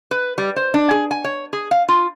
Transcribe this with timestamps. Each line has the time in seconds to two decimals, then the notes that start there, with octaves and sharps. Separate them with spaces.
0.11 B4
0.38 G3
0.56 C5
0.74 D4
0.91 G#4
1.11 G#5
1.24 C#5
1.53 G#4
1.71 F5
1.88 F4